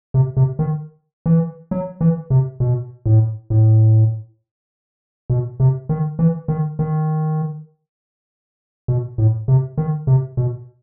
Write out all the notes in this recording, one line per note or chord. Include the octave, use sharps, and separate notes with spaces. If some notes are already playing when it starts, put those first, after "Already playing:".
C3
C3
D#3
E3
F#3
E3
C3
B2
A2
A2
B2
C3
D#3
E3
D#3
D#3
B2
A2
C3
D#3
C3
B2